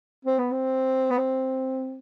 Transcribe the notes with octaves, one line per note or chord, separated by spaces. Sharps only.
C4
B3
C4
B3
C4